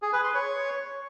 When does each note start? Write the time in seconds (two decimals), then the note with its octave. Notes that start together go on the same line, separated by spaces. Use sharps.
0.02 G#4
0.13 B4
0.24 C6
0.34 C#5